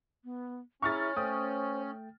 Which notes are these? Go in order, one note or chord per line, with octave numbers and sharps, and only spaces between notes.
B3
C#4 E4 G#4 E5 A#5 C#6 F6 A6
A3 C5 G5 D#6